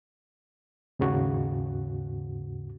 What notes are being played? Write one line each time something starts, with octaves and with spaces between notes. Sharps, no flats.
D#2 G#2 C#3 F#4